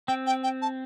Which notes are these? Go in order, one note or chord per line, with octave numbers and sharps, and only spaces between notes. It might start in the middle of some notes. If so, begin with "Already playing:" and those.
C4 G5
G5
G5
A5